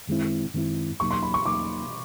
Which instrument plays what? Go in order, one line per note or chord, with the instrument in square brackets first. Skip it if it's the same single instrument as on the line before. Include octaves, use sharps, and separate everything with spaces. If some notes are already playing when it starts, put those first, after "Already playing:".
[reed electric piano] F#2 D#3 G#3 C4 E4
F#2 D#3 G#3 C4 E4
[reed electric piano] E2 B2 F#3 A#3 D#4 [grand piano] C#6
[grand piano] C6
B5
C#6
[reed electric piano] E2 B2 F#3 A#3 D#4 [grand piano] D6